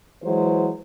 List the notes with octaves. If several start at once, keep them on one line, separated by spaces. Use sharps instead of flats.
E3 F#3 G#3 C5